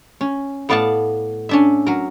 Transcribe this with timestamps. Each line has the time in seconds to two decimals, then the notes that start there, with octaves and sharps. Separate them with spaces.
0.21 C#4
0.69 A2 B3 D5 F5 F#5 A5
1.49 C#4 D4 E5
1.87 F#3 A#4